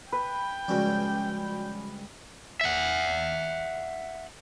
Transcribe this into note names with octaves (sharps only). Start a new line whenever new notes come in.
B4 G5
C#2 F3 G3 C#4 F#4 D5
E5 F#5